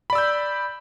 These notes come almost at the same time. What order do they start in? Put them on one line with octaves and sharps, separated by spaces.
B5 D5 E6 G6